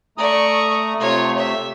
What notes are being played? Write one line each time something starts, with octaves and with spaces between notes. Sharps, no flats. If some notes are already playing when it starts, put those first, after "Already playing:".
A3 D5 A#5 C#6 D#6
C3 A3 F4 C#5
E5